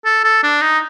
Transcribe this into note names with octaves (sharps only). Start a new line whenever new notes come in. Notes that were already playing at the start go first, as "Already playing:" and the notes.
A4
A4
D4
D#4